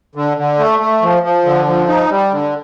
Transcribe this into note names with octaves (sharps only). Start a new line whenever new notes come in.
D3
D3
A3
A3
F3
F3
D3
F3
D#4
G3
D3